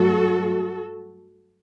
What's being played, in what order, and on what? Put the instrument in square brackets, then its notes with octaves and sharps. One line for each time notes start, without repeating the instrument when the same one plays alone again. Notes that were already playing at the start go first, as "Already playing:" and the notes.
Already playing: [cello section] G2 F#3 A3 F#4 A4